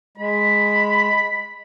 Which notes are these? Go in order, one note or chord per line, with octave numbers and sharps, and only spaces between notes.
G#3 B5